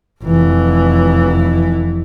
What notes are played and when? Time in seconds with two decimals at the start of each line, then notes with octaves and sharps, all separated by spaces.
0.23 F1 E3